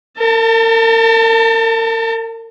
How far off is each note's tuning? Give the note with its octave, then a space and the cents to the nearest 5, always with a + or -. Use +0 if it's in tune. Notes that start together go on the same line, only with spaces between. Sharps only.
A#4 -40 A5 +25